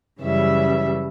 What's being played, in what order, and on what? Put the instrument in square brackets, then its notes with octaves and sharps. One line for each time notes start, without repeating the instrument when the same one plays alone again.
[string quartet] F#2 C#3 E3 G3 E5